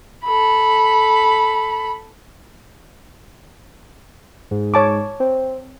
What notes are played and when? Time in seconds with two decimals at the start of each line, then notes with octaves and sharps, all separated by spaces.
0.25 A4 B5
4.51 G#2
4.74 C#5 A5 D6
5.20 C4